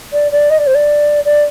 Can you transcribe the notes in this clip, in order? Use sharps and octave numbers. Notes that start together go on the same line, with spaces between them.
D5
D5
D#5
D5
C5
D5
D5